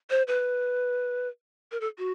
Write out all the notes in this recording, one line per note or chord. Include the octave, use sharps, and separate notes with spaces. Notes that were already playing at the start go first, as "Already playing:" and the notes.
C5
B4
A#4
A4
F#4